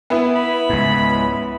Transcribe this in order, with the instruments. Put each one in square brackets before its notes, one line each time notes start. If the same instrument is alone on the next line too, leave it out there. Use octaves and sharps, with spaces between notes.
[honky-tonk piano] B3 E4
[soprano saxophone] B5
[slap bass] C#2 G#2